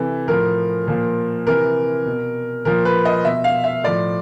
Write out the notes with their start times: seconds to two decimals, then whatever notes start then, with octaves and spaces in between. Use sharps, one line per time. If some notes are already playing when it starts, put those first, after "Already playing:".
Already playing: C3 E3 A4
0.27 A2 F3 A#4
0.87 A#2 F3
1.46 C3 E3 A#4
2.06 B2
2.65 A#2 F3 A#4
2.85 B4
3.05 D#5
3.25 B2 E5
3.44 F5
3.64 E5
3.84 A2 F3 D5